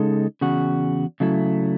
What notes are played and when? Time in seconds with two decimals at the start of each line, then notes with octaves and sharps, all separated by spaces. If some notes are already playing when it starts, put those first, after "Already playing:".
Already playing: C#3 G#3 D#4 A4
0.41 E2 C#3 F#4
1.20 C#3 F#3 A3 E4